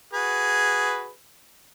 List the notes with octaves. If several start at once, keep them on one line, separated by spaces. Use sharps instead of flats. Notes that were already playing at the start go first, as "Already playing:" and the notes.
F#4 G#4 B4